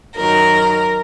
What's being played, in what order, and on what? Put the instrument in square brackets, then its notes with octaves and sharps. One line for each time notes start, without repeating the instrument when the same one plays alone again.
[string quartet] F#2 D#3 F#3 A#4